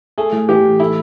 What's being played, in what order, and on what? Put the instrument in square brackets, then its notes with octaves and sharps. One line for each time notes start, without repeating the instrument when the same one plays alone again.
[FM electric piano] A3 [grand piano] G#4
[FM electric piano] A2
[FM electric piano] E3 [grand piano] G4
[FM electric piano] A2
[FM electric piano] A3 [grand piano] E4